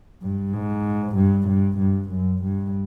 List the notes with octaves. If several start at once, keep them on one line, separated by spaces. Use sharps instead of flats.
G2
G#2
G2
G2
G2
F#2
G2